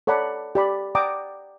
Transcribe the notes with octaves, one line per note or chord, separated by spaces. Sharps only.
A4 C#5 D5 F#5 A#5 B5
G4 D5 B5
D5 F#5 G5 A#5 D6 D#6